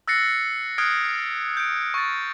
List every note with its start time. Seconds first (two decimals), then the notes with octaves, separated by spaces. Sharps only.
0.08 E6 F#6 A6 A#6 C7 C#7
0.78 D#6 F6 F#6 G#6 C7 D7
1.57 G6 D7
1.94 C#6 A6